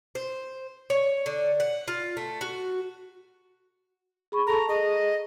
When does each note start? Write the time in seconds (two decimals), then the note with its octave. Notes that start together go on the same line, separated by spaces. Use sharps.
0.15 C5
0.90 C#5
1.26 D3
1.60 F#5
1.88 F4
2.17 A3
2.41 F#4
4.32 G#4 B5 C#6
4.47 A4 A5 A#5
4.69 G#4 D#5